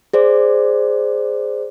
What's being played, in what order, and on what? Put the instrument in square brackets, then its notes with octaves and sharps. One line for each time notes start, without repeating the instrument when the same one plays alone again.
[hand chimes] G#4 C5 D5